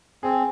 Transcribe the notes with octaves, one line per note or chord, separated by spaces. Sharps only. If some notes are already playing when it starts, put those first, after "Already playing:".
C4 G#4